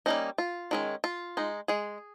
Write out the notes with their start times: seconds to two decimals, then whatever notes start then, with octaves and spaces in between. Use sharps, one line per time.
0.06 G3 A#3 C#4 D#4
0.38 F4
0.71 D#3 G#3 C#4
1.04 F4
1.37 G#3 D#4
1.68 G#3 G#4